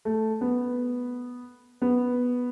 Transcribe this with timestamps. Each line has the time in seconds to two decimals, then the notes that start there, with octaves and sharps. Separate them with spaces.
0.05 A3
0.41 B3
1.82 B3